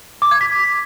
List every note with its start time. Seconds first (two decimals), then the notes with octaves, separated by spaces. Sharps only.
0.22 D6
0.31 G#6
0.41 B6